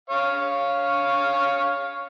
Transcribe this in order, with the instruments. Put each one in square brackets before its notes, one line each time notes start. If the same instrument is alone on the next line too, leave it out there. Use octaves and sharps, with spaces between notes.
[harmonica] C#5 F5